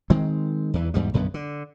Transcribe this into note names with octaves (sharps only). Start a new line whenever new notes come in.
D#3 G#3 C4
E2 E3
E2 G#2 G3
B1 F#2 D3 B3
D3